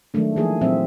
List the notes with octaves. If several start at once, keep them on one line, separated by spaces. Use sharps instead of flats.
D#3 F#3 G#3 A3 D4
E3 F3 A#3 G#4
A#2 F#3 C4 E5